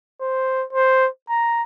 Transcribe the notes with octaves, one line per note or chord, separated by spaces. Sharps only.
C5
C5
A#5